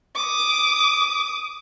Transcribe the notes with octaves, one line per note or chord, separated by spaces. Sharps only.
D6 D#6